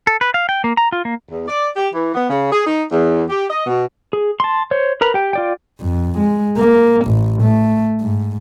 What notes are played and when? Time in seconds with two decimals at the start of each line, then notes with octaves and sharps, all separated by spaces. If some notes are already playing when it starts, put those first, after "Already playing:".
0.07 A4
0.21 B4
0.34 F5
0.49 G5
0.64 A#3
0.77 A#5
0.92 F4
1.05 A#3
1.29 E2
1.48 D5
1.76 G4
1.93 E3
2.14 B3
2.30 C#3
2.52 G#4
2.65 D#4
2.91 E2
3.29 G4
3.49 D#5
3.66 B2
4.13 G#4
4.40 A5 C6
4.71 C5 C#5
5.01 A#4 B4 A#5 B5
5.14 G4 G5
5.33 F4 D5 G5
5.80 F2
6.19 G#3
6.57 A#3
7.06 A1
7.42 A3
8.01 G#2